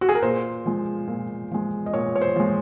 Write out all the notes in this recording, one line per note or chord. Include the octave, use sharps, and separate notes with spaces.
F#4
G#4
A#4
A#2 C5
F3 G#3
A#2
F3 G#3
D#5
A#2 C#5
C#5
C5
F3 G#3